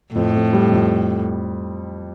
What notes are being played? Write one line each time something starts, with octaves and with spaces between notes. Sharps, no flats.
F2 A2
F2
G3
F2